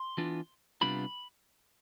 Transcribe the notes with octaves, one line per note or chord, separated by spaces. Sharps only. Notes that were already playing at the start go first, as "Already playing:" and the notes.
Already playing: C6
E3 B3 D4 F4
C3 G3 B3 D4 F4 B5